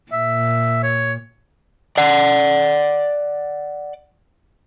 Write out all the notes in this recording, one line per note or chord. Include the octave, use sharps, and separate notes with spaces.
A#2 E5
C#5
D5 F#5